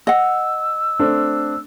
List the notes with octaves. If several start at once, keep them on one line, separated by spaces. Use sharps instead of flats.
D#5 F#5 E6
A3 C4 D4